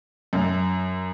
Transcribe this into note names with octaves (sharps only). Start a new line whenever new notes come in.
F#2